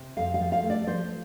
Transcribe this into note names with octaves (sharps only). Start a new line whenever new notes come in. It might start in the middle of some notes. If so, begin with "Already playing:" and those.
Already playing: C3
F2 F5
F5
F3
F5
A3
D5
F3 C5